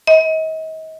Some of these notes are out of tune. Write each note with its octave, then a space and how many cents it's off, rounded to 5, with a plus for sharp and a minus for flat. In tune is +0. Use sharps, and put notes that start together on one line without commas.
D#5 +35